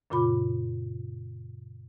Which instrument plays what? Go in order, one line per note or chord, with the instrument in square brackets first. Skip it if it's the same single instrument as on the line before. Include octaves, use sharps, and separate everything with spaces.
[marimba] F#2 A#2 C#3 F4 B5 D6